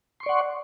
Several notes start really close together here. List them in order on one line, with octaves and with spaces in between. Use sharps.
C6 C#6 D5 F#5